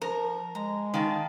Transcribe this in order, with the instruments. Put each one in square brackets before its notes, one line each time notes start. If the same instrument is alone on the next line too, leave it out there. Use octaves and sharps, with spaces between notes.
[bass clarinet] F3 [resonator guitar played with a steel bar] A#4 [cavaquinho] A#5
[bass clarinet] G#3 [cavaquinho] A#5
[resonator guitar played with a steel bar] D#3 [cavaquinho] F5 A5